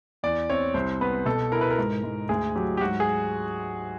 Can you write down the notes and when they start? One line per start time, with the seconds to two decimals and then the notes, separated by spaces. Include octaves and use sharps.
0.23 E2 D5
0.50 C4 C#5
0.74 C2 C5
1.01 B3 B4
1.26 B2 A4
1.52 E4 A#4
1.61 B4
1.71 A#4
1.78 G#2
2.04 G#2
2.29 D2 G#4
2.56 F#3 G4
2.77 G4
2.81 G#2 F#4
3.00 G#4